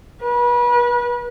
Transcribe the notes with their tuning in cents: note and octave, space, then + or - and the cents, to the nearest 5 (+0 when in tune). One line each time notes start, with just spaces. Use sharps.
B4 -35